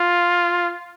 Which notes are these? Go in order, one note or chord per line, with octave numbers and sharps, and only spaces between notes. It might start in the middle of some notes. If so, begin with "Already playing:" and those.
Already playing: F4